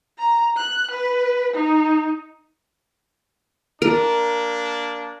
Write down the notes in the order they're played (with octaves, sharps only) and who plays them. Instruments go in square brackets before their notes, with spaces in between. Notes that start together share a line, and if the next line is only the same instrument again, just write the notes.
[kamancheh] A#5
F#6
B4
D#4
[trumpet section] A#3 D4 [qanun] A#4